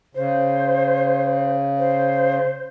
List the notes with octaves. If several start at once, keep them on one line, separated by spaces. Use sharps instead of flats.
C#3 C5
C5